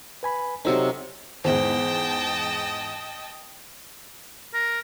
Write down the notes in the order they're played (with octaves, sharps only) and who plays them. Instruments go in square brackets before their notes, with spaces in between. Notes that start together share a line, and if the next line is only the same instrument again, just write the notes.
[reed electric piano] B4 G#5 B5
[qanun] C3 F#3 D#4 [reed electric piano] A4 C5 E6
[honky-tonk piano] E2 G#2 [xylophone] C5 [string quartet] D#5 G5 A5
[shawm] A#4